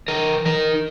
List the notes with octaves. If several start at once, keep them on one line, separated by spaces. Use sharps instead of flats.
E3 A#4
D#4 A#4